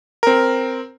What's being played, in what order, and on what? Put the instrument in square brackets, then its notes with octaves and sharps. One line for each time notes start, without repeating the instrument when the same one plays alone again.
[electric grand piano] C4 A#4